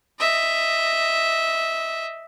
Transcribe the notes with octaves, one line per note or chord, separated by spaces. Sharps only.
D#5 E5